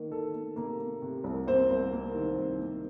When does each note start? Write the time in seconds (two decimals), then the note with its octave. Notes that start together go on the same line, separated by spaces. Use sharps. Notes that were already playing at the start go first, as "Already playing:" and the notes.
Already playing: D#3 A#3
0.11 D#3 A4
0.34 A#3
0.56 C3 A#3 A#4
0.80 A#3
1.02 C3
1.24 C2
1.47 A#3 C4 C5
1.70 C2
1.92 A#3
2.15 D#3
2.38 C2
2.60 A#3